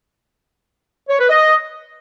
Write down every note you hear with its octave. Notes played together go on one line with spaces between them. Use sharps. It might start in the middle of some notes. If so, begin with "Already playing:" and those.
C#5
B4
D#5